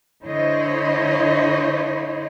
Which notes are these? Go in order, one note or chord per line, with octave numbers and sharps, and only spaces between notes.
D3 E4 C5 C#5 D#5